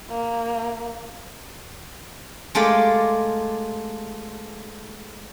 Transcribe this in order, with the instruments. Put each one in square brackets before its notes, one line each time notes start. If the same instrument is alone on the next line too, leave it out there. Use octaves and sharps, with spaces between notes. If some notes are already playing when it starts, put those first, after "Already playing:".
[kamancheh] A#3
[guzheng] G#3 A3 F4 G4 A#4 D5